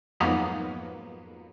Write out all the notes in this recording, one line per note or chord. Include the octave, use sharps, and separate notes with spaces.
F2 G#2 F#3 A#3 B3 D#4